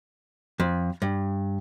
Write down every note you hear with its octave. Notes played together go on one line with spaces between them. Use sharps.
F2
G2